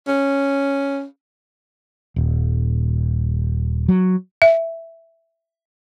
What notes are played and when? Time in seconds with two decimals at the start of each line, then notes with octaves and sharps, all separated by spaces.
0.07 C#4
2.16 D#1
3.89 F#3
4.42 E5